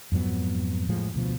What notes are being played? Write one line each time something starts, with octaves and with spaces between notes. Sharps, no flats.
F2 G#2 F#3 B3
A2 F3 G#3
D2 B2 F3